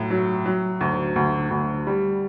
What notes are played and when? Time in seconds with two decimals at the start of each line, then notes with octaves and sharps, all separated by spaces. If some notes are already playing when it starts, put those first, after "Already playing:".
Already playing: A2 F#3
0.10 F#3
0.46 F#3
0.81 D2
1.16 D2
1.50 D2
1.87 G3